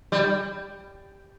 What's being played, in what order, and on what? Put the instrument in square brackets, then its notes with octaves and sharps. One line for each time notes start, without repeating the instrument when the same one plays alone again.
[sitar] G3